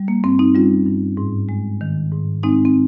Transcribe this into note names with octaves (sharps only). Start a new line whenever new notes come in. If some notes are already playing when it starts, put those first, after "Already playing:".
Already playing: G3
A#3
G2 C4
C4 D#4
G3 C#4 F4
G2
G#2
G#3
D#3
G#2
G#3 C4 D#4
C4